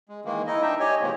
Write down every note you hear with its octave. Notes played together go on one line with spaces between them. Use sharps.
G#3
D#3 E3 G#3 A#3
D#4 E4 D#5
D4 D#4 E5 G5
G4 C#5 D#5 G#5
B2 D#3 E3 G#3 A#3 C4